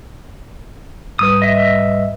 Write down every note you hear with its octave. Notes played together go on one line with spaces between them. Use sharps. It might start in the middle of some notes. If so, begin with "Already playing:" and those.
G#2 G3 B4 D#6
D#5 E5